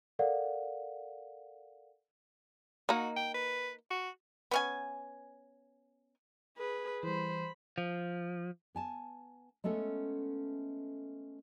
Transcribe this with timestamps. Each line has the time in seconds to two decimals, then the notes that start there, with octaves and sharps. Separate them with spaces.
0.19 A4 A#4 D5 F5 F#5
2.89 A#3 D#4 F#4
3.16 G5
3.34 B4
3.91 F#4
4.51 B3 C#4 G#5
6.58 G#4 B4
7.03 E3 G3 C5 B5
7.78 F3
8.75 B3 G#5 A5
9.64 G#3 A3 B3 C#4 A4